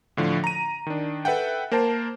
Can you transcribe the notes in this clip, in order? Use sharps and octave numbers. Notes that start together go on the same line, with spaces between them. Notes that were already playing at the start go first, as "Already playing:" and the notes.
A2 D3 F3
A#5 D#7
D#3 D4
A4 B4 E5 F#5 G5
A#3 A#4 C5 A5